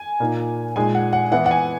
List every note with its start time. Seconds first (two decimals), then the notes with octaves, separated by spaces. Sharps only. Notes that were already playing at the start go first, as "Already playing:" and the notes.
Already playing: G#5
0.20 A#2 A#3 D#4
0.76 A#2 G#3 D#4 G#5
0.95 F#5
1.13 F#5
1.31 E3 B3 E4 F#5
1.46 F#5
1.51 G#5